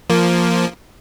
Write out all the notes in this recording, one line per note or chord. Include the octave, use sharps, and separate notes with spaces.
F3 A#3